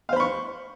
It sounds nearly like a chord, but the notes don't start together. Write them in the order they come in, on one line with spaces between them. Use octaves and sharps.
F5 C5 B5 C#6